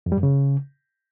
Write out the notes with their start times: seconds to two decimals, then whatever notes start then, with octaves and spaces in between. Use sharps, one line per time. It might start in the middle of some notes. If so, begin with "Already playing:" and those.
0.06 F2
0.12 G3
0.17 F#2
0.23 C#3